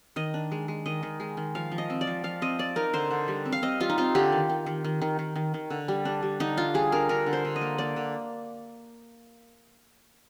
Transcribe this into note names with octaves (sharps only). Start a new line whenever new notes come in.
D#3 D#5
D4
G#3
G#3
D#3 D#5
D#3
G#3
D#3
F3 F5
F3
D#5
C4
D5
F3
F3 F5
C4 D#5
C4 D5
D#4 A#4
D3 C5
D3
G3
C4
F5
C4 D#5
G3 F4
D#4
C4 F4
D3 G4
D#3
D#3
D#3
D#3
D#3
D#3
D#3
D#3
D3
G3
D4
G3
D3 D#4
D4 F4
G3 G#4
D4 A#4
D3 A#4
D3
C5
D3
D#5
A#3
A#3 D5
D3